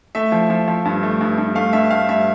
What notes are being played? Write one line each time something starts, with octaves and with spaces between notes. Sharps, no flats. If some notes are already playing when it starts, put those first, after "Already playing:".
A3 E5
F3
F3
F3
G2
A3
G2
G2
A3 F5
G2 E5
A3 F5
G2 E5